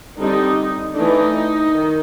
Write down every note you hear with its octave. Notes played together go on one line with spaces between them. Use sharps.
D3 G3 C4 D#4
E3 A3 D4 D#4
D#3